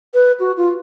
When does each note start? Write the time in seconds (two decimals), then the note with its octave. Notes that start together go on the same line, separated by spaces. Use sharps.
0.14 B4
0.40 F#4
0.57 F4